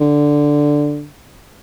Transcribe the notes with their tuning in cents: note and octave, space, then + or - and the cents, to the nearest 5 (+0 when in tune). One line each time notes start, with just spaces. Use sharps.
D3 +0